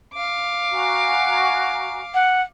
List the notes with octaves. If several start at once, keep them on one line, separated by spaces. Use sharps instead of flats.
F5 D6
F#4 G#5 A#5
F#5